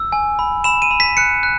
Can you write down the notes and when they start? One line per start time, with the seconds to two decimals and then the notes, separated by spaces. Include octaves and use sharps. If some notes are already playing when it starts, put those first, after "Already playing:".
Already playing: E6
0.12 G#5
0.39 B5
0.64 B5 E7
0.82 D#7
0.91 B5
1.00 B6
1.17 F#6 C#7
1.43 F#6